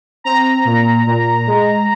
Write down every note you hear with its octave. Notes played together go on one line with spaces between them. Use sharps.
C4 A#5
A#2
A#2
G#3